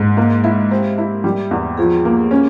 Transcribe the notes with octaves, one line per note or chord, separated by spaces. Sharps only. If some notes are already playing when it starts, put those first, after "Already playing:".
Already playing: G#2 G#3
A#3
E4
C4 G4
E4
G3
E2
F3 G#4
A#3
C#4